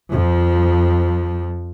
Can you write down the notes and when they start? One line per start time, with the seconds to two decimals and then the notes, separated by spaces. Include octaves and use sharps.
0.10 F2 F3